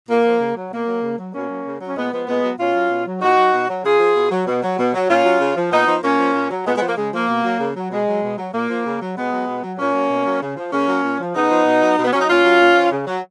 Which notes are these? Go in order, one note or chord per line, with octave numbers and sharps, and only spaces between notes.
A#2 A#3
F3
C#3
F#3
B2 A#3
F#3
C#3
F#3
B2 A#3 C#4
F#3
C#3
F#3 C#4
A#2 G#3 B3
F3 G#3 B3
A#2 G#3 B3
F#3
B2 C#4 F4
F#3
B2
F#3
A#2 D#4 F#4
F#3
B2
F#3
C#3 F4 G#4
F3
B2
F#3
B2
F#3
B2
F#3
A#2 C#4 F4
F#3
C#3
F3
A#2 B3 D#4
F3
A#2 A#3 C#4
F3
A#2
F#3
A#2 G#3 B3
G#3 B3
F3 A#3
C#3 G#3
F3 A#3
B2
F#3
C#3
F#3
B2 G#3
F#3
B2
F#3
A#2 A#3
F3
C#3
F#3
B2 G#3 B3
F#3
B2
F#3
A#2 A#3 C#4
F#3
B2
F#3
C#3
F3
C#3 A#3 C#4
F#3
A#2
F3
C#3 B3 D#4
F3
B2
F#3
B2
B3
F#3 C#4
D#4
A#2 C#4 F4
F#3
A#2
F3
C#3
F#3